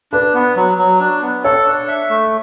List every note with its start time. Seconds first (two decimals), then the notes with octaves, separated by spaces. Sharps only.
0.12 D4 B4
0.34 B3
0.56 F#3
0.78 F#3
1.00 D4
1.22 B3
1.44 A4 C#5
1.66 D4
1.88 E5
2.09 A3